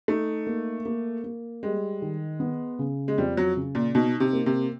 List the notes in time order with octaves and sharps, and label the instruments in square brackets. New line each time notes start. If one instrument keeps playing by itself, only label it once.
[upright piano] A3 [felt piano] D#4
[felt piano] A#3
A#3
A#3
[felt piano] G3 [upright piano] G#3
[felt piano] D#3
B3
C#3
[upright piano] G#3
[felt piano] F2 [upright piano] G3
[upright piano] F#3
[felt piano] C#3
[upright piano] A#2
[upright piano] B2 [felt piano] D#4
[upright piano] C3
[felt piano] A#3
[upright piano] C3